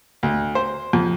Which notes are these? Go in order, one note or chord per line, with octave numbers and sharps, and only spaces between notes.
D2
C5
F2